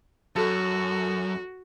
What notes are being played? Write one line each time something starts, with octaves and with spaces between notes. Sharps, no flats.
F#2 F#4 A4